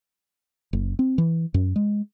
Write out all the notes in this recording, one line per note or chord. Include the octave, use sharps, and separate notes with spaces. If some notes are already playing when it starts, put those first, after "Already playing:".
F#1
C4
E3
F#2
G#3